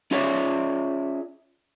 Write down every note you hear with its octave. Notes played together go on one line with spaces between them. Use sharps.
C#4 F4 G#4 C#5 D5 E5